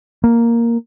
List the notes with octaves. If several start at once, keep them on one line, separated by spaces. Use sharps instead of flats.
A#3